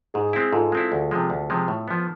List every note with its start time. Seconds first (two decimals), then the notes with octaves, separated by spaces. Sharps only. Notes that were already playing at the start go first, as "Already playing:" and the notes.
0.14 G#2 G#4
0.33 G#3 C4 E4
0.52 G#2 F4 A4
0.72 G#3 C4 E4
0.92 D2
1.11 C3 F3 G#3
1.30 D2
1.50 C3 F3 G#3
1.68 A2
1.88 F3 B3